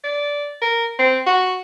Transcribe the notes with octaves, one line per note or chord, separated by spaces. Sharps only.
D5
A#4
C4
F#4